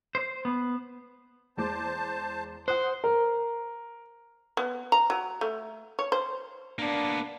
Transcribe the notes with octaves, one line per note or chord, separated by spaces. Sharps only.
C5
B3
E2 G#3 C5 A5 D6
C5 F#5 D#6 F#6
A#4
B3
A#5
F#3
A3
C#5
C5
A#3 B3 D4